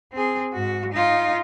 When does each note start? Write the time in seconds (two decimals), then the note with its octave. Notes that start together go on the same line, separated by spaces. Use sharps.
0.12 C4 G#4
0.53 G#2 F#4
0.92 D#4 F4